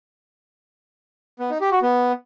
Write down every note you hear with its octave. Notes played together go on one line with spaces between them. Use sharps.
B3
D#4
G4
F#4
B3